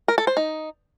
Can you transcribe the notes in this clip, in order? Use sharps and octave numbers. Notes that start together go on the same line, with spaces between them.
A#4
A4
C5
D#4